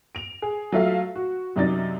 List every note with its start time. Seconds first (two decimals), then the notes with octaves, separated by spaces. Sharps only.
0.15 D7 F7
0.42 G#4
0.72 F#3 A3 F4 A4 E5 F5
1.16 F#4
1.56 F#2 C3 F#3 D#4 D5 A6